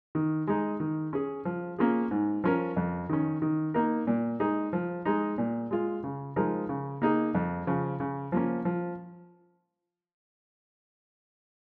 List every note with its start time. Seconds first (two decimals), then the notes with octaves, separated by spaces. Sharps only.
0.15 D#3
0.47 G#3 D#4
0.80 D#3
1.13 C#4 G#4
1.45 F3
1.79 A#3 C#4 F4 G#4
2.11 G#2
2.44 F3 C#4 A#4
2.77 F2
3.09 D#3 C#4
3.42 D#3
3.74 A#3 D#4 A#4
4.07 A#2
4.40 G#3 D#4 G#4
4.73 F3
5.05 G#3 D#4
5.38 A#2
5.71 G#3 F4
6.04 C#3
6.36 F3 G#3 D#4 A#4
6.69 C#3
7.02 A#3 D#4 G#4
7.35 F2
7.67 C#3 F3
8.00 C#3
8.32 F3 A#3 C#4
8.65 F3